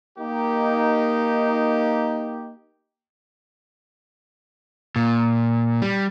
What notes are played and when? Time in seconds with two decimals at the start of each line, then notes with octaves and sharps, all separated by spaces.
0.19 A#3 D#4 G4
4.96 A#2
5.82 G3